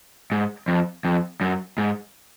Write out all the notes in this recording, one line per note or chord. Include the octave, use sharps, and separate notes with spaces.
G#2
F2
F2
F#2
G#2